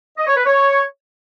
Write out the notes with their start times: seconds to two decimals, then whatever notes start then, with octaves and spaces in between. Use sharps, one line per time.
0.17 D#5
0.27 C#5
0.36 B4
0.46 C#5